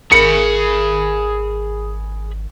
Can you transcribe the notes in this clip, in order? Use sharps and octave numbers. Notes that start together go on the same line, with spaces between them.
G#1 G#4 A#4 B5 C#7